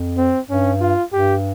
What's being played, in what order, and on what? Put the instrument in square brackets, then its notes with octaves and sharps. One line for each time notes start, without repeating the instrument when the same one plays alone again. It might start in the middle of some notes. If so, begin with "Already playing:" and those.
Already playing: [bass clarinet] F2
[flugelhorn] C4
[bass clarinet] G2 [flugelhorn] C#4
[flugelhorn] F4
[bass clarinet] G2 [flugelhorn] G4